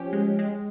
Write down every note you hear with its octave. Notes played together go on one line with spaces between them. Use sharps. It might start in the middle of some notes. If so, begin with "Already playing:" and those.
Already playing: F3 C#4 G4
G#3
G#3